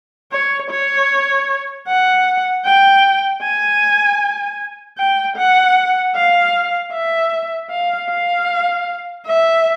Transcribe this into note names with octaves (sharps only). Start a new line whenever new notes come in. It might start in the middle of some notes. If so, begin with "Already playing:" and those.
C#5
C#5
F#5
G5
G#5
G5
F#5
F5
E5
F5
F5
E5